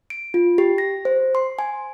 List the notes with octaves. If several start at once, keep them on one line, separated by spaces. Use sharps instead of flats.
D7
F4
G4
A#6
C5
C6
G#5